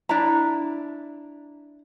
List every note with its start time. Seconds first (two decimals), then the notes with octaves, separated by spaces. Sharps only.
0.09 D4 E4 A#5